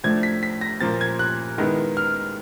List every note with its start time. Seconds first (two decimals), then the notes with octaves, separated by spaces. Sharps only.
0.04 A2 F3 A3 D4 G#6
0.23 B6
0.43 B6
0.61 A#6
0.81 A#2 F3 A#3 A6
1.01 G#6
1.19 F#6
1.58 D#3 G#3 B3 E4
1.97 F6